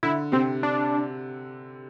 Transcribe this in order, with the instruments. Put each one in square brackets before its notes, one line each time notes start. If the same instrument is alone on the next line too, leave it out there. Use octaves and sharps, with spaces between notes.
[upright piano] D3 [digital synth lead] E4
[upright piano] C3 [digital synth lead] C4
[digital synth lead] D4